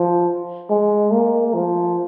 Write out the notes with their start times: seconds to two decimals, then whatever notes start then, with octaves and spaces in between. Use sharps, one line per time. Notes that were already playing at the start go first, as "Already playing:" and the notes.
Already playing: F3
0.69 G#3
1.11 A#3
1.53 F3